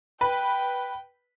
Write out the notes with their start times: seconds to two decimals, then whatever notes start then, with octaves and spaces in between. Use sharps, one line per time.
0.21 B4 G5